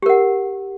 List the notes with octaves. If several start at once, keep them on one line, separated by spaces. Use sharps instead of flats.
G4 A#4 F#5